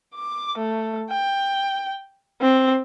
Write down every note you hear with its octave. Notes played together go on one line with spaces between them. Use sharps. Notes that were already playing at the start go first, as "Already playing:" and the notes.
D6
A3
G5
C4